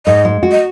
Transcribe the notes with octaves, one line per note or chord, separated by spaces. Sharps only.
G#2 D#5
G#3
F#4
D#5